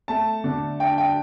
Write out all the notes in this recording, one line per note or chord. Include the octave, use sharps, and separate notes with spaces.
A3 A5
D3
D4 G5
G5